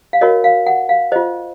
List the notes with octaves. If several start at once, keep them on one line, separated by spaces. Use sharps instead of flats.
F5
F#4 A#4 C#5 D#5
F5
F#5
F5
F4 C5 D#5